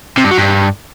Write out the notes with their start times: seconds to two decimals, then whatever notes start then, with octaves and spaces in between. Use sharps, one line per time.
0.18 C3
0.24 G2
0.31 F#3
0.38 G2